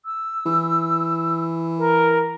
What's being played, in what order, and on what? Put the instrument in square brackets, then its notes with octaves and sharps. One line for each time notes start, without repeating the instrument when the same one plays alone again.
[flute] E6
[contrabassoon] E3
[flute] A#4